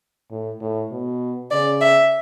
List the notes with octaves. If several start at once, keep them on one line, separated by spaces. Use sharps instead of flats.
A2
A2
B2
C#3 D5
E5